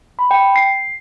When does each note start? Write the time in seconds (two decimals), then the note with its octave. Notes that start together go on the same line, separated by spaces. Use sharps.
0.19 B5
0.31 G5
0.56 C7